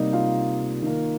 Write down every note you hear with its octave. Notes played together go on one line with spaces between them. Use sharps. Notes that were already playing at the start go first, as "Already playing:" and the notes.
Already playing: C3 G3 A#3 D#4 D#5
F4 F5
D#3 A#3